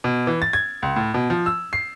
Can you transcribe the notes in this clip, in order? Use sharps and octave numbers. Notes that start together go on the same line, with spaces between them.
B2
E3
A6
G#6
C#2
A2
B2
F3
E6
C7